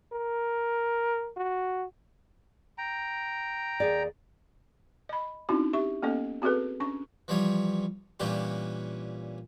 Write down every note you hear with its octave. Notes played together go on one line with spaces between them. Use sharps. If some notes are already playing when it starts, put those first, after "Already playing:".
A#4
F#4
G5 A#5
D#2 G#4 D5
D#5 B5
C4 C#4 D#4 E4 F#4
G4 E5 C#6
A#3 B3 C#4 A4 D#5
C4 F#4 G#4 A4 B4
C#4 D4 C#6
E3 F3 G3 C#5
A#2 E3 G3 C#4 D4 G4